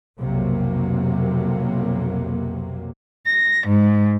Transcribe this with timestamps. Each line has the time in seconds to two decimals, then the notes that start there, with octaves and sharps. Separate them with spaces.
0.19 B1 F2 C3 F#3 A#3
3.25 A#6
3.67 G#2